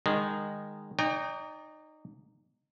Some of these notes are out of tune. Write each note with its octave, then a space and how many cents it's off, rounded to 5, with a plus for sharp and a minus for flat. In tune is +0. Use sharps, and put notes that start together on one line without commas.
D#3 -10 G#3 -20
D#4 -15 D5 -45 G5 +35